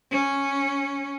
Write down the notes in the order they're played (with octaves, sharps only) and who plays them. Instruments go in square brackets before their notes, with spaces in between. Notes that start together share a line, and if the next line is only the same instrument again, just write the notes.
[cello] C#4